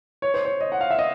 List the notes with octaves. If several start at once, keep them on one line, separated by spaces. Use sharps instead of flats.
C#5
C5
C#5
D#5
F#5
F5
E5
D#5